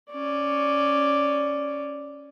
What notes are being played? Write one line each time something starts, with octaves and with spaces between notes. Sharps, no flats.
C#4 D5